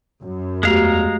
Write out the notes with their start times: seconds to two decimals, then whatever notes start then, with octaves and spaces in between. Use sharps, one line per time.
0.21 F#2
0.63 E2 G#3 A3 F#4 G4 F5 A#5